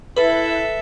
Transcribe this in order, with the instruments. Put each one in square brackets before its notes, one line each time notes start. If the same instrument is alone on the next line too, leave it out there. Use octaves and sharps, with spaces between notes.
[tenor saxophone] E4 [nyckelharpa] A4 E5 [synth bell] B4